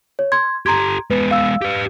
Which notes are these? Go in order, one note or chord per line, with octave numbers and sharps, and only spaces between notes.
C#5
C6 G#6
G4 A4 A#5 C6 G#6
G#3 B3 B4
F5 E6
G4 B4